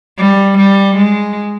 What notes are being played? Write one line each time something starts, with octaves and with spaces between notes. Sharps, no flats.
G3
G3
G#3